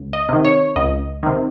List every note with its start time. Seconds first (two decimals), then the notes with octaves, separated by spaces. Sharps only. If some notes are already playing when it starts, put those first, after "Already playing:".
Already playing: C#2
0.13 D#5
0.29 C3 D#3
0.45 C#5
0.76 C#2 D#5
1.23 C3 D#3